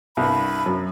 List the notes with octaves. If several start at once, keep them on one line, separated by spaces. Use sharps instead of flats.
C2 G2 B5
F#2